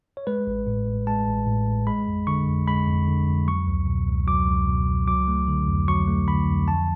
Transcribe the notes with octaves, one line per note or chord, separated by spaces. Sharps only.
C#5
G#3 B4
A1
A2
A1
G#3 A5
A1
A2
A1
G#3 B5
F2
D3 C#6
F2
G#3 B5
F2
D3
F2
F#3 C#6
C#2
B2
C#2
F#3 D6
C#2
B2
C#2
F#3 D6
A3
D3
F2
F#3 C#6
A3
D3 B5
F2
F3 A5